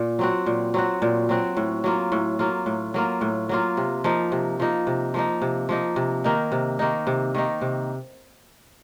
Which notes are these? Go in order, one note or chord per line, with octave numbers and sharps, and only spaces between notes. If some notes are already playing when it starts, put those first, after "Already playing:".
Already playing: A#2
F#3 C4 F#4
A#2
F#3 C4 F#4
A#2
F#3 C4 F#4
A2
F#3 A#3 F4
A2
F#3 A#3 F4
A2
F#3 A#3 F4
A2
F#3 A#3 F4
C3
F3 A#3 D#4
C3
F3 A#3 D#4
C3
F3 A#3 D#4
C3
F3 A#3 D#4
C3
D#3 A#3 D#4
C3
D#3 A#3 D#4
C3
D#3 A#3 D#4
C3